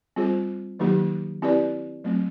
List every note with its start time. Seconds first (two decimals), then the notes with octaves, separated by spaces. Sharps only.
0.16 G3 C4 F4 G#4 C5
0.79 D#3 F#3 A#3 D#4 G4
1.42 C4 E4 G4 B4 D5
2.04 F#3 A3 C4